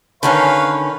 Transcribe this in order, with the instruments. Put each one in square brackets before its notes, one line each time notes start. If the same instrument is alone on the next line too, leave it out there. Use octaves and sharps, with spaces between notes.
[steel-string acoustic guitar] D3 D#3 C#4 [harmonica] B4 C#5 F5